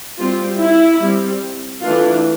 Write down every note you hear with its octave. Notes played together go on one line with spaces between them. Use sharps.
G3 C4 F4
E4
G3 C4
E3 A3 D4 F4